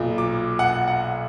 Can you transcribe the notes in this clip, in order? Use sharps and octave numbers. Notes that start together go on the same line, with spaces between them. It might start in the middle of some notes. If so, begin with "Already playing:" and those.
Already playing: B1 A#2
D6
F#5
F#5